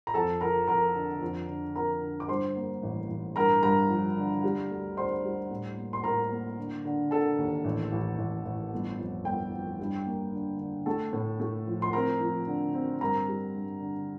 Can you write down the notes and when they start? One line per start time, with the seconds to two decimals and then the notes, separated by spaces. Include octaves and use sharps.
0.07 A#5
0.14 F2 A4 A5
0.41 F3 A#4 A#5
0.68 F2 A#4 A#5
0.94 D3
1.21 F2
1.48 D3
1.76 F2 A#4 A#5
2.02 D3
2.20 D6
2.28 G2 C5 C6
2.56 A#3
2.83 A1
3.09 A1
3.36 G2 A#4 A#5
3.63 G2 A#4 A#5
3.89 F3
4.17 D3
4.44 G3
4.70 D2
4.97 D4 C5 C6
5.24 G3
5.51 A2
5.77 A#3
5.93 C6
6.04 A2 A#4 A#5
6.31 A#3
6.58 D3
6.85 D3
7.11 D3 A4 A5
7.38 D#2
7.64 A1
7.92 A1
8.18 A1
8.45 A1
8.72 G1
8.99 F2
9.25 G1 G5
9.52 F2
9.80 G2
10.06 A#3
10.33 D3
10.59 D3
10.86 A3 A4 A5
11.13 A2
11.40 A3
11.66 F3
11.82 C6
11.93 C4 A#4 A#5
12.20 F3
12.47 D3
12.74 C4
13.01 G2 A#4 A#5
13.28 G3
13.55 G2
13.81 D3